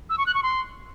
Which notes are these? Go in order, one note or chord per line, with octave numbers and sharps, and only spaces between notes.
E6
C#6
F#6
C#6
C6